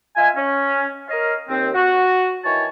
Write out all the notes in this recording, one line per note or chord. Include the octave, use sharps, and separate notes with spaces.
F4 D#5 E5 G#5
C#4
A#4 C#5 D#5 F5
D#2 C4
F#4
D#3 E3 C#5 A5 C#6